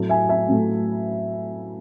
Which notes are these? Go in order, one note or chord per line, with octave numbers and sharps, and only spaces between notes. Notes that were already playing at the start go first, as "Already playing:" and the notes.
Already playing: A2 F#3 A3
E5 G#5
E5 G#5
A2 F#3 A3